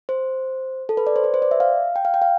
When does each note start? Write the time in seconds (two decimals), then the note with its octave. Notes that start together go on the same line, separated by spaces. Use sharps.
0.09 C5
0.89 A4
0.97 B4
1.07 D5
1.16 C5
1.24 B4
1.34 C5
1.42 D5
1.51 E5
1.60 F5
1.96 G5
2.05 F5
2.14 G5
2.22 F5